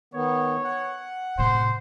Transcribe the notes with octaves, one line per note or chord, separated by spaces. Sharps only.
D#3 B3 C#5
F#5
A2 C3 C5